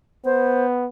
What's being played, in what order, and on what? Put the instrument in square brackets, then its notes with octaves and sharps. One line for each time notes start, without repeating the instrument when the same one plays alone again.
[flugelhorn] B3 [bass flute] C5